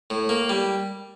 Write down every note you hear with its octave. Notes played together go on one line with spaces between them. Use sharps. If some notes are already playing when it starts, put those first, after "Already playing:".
A2
A#3
G3